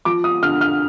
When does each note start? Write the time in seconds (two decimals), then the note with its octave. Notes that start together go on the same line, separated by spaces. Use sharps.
0.05 F3 D6
0.24 D#6
0.42 D3 F6
0.61 F6